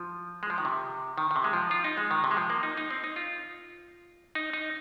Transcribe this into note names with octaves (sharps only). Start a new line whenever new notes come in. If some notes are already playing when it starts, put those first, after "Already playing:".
Already playing: F3
G#3
F3
D#3
C3
D#3
D#3
C3
G#3
F3
F4
D#4
G#3
D#3
C3
G#3
F3
A#3
D#4
D#4
C4
D#4
F4
D#4
D#4